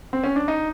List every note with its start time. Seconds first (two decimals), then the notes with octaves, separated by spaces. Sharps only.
0.13 C4
0.24 C#4
0.36 D4
0.48 D#4